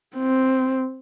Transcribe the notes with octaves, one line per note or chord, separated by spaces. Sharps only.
C4